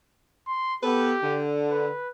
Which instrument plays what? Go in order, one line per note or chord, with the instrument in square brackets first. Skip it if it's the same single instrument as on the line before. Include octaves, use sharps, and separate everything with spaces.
[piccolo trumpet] C6
[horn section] B3 A4 B4 [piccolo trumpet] G4
[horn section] D3
[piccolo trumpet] B4